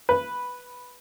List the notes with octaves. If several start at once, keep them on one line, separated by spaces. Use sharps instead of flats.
B4